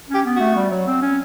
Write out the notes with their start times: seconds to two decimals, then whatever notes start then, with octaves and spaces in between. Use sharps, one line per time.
0.09 C#4 G4
0.25 B3
0.36 A3 F#4
0.56 G3
0.71 F#3
0.87 C4
1.02 C#4